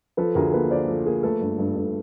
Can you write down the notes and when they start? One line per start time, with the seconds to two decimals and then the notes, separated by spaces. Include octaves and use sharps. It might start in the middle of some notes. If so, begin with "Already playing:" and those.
0.17 F3 A4 B4
0.35 D2 G#4 A#4
0.52 A#3 A4 B4
0.71 A#3 C5 D5
0.88 F3 A4
1.06 A#3 G#4 A#4
1.23 A3 A4 B4
1.41 G2
1.58 G2
1.75 G2 A4